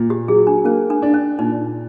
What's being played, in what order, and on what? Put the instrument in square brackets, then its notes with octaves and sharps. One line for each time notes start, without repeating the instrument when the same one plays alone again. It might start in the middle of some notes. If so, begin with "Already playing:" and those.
Already playing: [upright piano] A#2
[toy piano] G4
[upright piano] F#3 [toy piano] G#4
[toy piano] D4
[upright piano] A#3 [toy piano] C#4
[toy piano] D4
[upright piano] D4
[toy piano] C#4
[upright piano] A#2 [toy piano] D#4